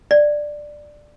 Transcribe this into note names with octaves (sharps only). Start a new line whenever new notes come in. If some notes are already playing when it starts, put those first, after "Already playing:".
D5